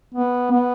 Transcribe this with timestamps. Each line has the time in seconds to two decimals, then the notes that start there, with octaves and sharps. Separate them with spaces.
0.14 B3
0.51 B3